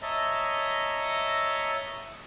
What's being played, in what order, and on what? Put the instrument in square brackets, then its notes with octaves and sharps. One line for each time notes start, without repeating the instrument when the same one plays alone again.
[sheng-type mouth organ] C#5 D#5 E5 A5 A#5